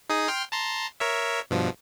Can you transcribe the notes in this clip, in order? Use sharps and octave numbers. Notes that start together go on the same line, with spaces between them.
D#4 G#4 D#6
G5 C6 F6
A5 A#5 C6
A#4 C#5 E5
G2 B2 F3